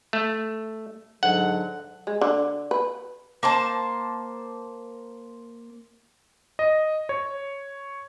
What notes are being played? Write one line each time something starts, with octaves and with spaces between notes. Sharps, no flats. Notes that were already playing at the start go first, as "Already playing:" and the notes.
A3
G#2 D3 F#3 F#5
G#3
D3
B4
A#3 C5 A5
D#5
C#5